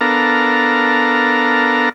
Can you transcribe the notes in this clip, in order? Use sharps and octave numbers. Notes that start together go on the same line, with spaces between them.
B3 D4 A4 A#4 F5 A#5